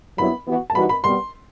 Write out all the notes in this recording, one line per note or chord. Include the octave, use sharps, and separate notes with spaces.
G2 F#3 B3 E4 B5
E3 B3 F#4
A5
E3 G3 D#4 F#4 B5
B5
B2 G3 B3 C6